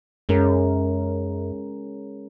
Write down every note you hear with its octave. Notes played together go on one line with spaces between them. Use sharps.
F#2 G#3 C#4 A#4